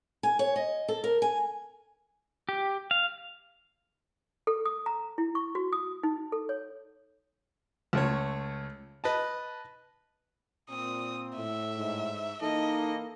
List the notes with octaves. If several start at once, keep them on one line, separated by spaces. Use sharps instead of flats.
G#5
C#5
D#5
A4
A#4
G#5
G4
F5
A4
D#6
A#5
E4
C#6
F#4
D#6
D#4
A4
C#5
C#2 A3 C#5
B4 D#5 A5
A#2 C4 D#6
A2 E5
G#2
E3 A#3 D#4 A4 D#5